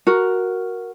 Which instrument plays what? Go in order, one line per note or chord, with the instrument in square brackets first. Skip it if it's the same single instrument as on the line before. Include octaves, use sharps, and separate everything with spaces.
[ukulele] F#4 A#4